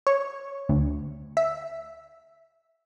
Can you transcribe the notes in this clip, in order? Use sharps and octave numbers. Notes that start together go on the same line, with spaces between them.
C#5
D2
E5